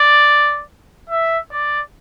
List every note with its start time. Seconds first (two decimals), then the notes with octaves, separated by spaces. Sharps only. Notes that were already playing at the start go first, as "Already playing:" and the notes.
Already playing: D5
1.10 E5
1.51 D5